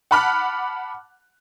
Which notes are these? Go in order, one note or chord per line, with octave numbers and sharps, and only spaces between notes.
F#5 A5 B5 D6 F6 F#6